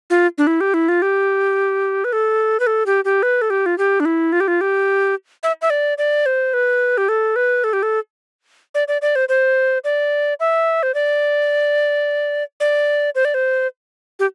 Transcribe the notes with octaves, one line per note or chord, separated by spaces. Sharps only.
F4
D4
E4
G4
E4
F4
G4
B4
A4
B4
A4
G4
G4
B4
A4
G4
F4
G4
D4
E4
F4
G4
F4
G4
E5
E5
D5
D5
C5
B4
G4
A4
B4
A4
G4
A4
D5
D5
D5
C5
C5
D5
E5
C5
D5
D5
C5
D5
C5
G4